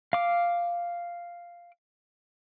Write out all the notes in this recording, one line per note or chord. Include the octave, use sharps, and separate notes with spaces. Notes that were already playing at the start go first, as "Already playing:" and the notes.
F5 D6